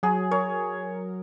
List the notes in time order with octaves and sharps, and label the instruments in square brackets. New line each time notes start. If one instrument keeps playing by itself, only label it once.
[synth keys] F#3 [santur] G#4
[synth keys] A#4 [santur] C#5